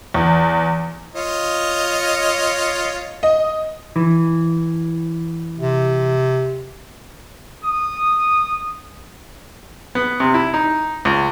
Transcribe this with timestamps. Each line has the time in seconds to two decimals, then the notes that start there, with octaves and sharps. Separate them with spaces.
0.14 E2
1.15 F4 C#5 D#5
3.23 D#5
3.96 E3
5.59 C3
7.64 D#6
9.95 B3
10.20 C3
10.34 E4
10.54 D#4
11.05 C#2